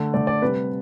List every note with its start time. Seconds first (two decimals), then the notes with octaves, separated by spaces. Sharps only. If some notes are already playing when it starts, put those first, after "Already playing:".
Already playing: D3 A3
0.14 D3 A3 D5
0.27 D5
0.42 C3 G3 B4